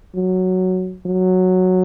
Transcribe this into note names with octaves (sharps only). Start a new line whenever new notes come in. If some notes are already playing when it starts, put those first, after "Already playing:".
F#3
F#3